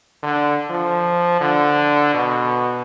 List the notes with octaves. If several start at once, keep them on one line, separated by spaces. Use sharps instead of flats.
D3
F3
D3
B2